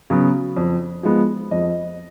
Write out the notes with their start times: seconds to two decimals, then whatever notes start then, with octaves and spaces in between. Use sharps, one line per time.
0.10 C#3 F#3 B3
0.56 F2
1.03 F3 G#3 B3
1.51 F2 D#5